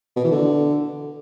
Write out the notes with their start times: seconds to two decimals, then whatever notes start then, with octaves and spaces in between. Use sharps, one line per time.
0.16 B2
0.24 E3
0.32 D3